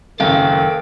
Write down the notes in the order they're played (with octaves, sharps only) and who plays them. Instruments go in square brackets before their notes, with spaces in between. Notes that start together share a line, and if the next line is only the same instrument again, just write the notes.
[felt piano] F#1 F#2 [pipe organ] D#3 G5 [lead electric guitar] A4 F5